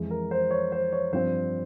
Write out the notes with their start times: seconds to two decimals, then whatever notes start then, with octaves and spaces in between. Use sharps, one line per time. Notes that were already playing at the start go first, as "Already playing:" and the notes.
Already playing: F2 E3 G#3
0.11 A#4
0.31 C5
0.51 C#5
0.72 C5
0.93 C#5
1.13 G2 F3 C4 C5